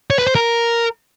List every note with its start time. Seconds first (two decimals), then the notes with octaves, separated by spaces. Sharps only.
0.10 C#5
0.19 B4
0.27 C5
0.35 A#4